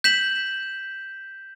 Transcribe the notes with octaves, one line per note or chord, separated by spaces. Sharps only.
G6 B6 E7 F#7